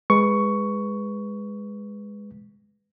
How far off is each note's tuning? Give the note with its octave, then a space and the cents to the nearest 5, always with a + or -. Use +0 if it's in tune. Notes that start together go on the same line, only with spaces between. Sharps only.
G#3 -10 B4 +0 C#6 +10